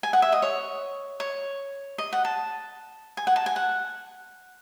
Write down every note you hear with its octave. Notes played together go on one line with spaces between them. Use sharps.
G#5
F#5
E5
D#5
C#5
C#5
D#5
F#5
A5
G#5
F#5
A5
G#5
F#5